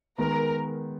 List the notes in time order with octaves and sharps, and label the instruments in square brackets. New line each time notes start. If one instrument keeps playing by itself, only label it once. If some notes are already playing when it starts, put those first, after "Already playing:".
[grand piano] D#3 G#3 B3 [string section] A#4